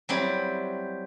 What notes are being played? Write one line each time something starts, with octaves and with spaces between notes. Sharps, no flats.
F#3 G3 C4 E4